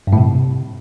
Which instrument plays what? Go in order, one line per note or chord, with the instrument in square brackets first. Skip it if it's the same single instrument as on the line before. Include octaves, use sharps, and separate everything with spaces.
[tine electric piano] G2
A2
C3